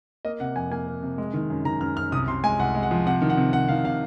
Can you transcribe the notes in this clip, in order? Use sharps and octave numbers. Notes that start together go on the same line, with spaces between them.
A#3 D#5
C3 F#5
F2 G#5
A#3 G#5
A#3
C3
G#3
D#3
F#2
D#3 A#5
F#2 F6
F#2 F6
C2 D#6
C3 C6
G#3 G#5
C2 F#5
G#3
F#5
F3
C3 F#5
D#3
F#5
C3
C3 F#5
D#3 F5
C3 F5